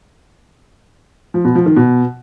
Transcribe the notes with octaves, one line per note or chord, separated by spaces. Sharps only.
F3
B2
F3
D#3
B2